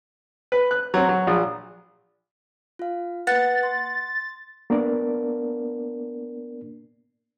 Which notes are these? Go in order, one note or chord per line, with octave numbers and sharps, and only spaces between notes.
B4
F#6
F#3 C4
F#3
A#1
F4 F5
A#3 B4 F#5 A6
C6
A#3 B3 D4 A#4 D5